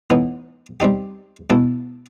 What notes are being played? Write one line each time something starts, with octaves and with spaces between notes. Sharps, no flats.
A2 E3 B3 D#4
G3 C4 D#4 G4
B2 A3 E4 A4